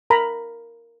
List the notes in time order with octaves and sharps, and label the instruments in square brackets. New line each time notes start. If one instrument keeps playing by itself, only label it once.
[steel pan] A#4 A#5 B5